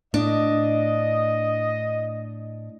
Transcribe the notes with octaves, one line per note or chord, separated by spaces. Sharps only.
A2 D4 D#5